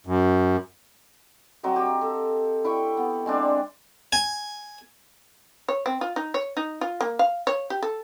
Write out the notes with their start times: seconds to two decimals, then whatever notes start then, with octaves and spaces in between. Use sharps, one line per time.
0.07 F#2
1.63 F#3 C4 D#5 F5
1.76 G4
2.01 A4
2.64 E4 G5 C#6
2.97 B3
3.26 G#3 C4 D4 D5
4.13 G#5
5.68 C#5
5.86 C4
6.01 F4
6.16 D#4
6.34 C#5
6.57 D#4
6.81 F4
7.01 A#3
7.19 F5
7.47 C#5
7.70 G4
7.82 A4